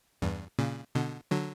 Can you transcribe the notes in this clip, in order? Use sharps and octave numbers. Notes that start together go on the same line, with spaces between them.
E2 G2
A#2 C#3
B2 D3
D3 F#3